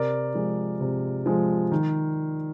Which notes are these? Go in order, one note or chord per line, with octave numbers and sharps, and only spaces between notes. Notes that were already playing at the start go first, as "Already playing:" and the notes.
Already playing: C3 A#4 D5
F3 G#3
C3
F3 G#3
D#3